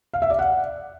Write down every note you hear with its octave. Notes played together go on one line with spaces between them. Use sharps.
F5
E5
D5
F#5